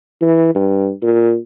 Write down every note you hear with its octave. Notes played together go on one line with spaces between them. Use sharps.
E3
G2
A#2